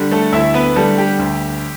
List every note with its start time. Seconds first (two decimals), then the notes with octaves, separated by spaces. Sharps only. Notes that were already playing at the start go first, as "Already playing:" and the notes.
Already playing: D3 G3
0.11 A3 A4
0.32 D2 E4 E5
0.54 B3 B4
0.76 D3 G3 A3 A4
0.98 G4
1.19 D2